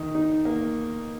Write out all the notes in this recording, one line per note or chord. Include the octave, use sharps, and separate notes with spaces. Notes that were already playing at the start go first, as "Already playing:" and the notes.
Already playing: D#3
D#4
A#3